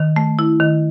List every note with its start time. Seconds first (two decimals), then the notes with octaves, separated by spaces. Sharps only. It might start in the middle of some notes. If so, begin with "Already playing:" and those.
Already playing: D#3
0.16 A3
0.39 E4
0.60 D#3